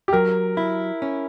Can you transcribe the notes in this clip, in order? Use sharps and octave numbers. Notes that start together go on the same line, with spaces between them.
G4
F#3 A#4
E4
C#4